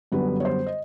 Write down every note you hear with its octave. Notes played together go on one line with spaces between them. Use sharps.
F#2 D3 G3 B3 B4
C#5
C5
D#5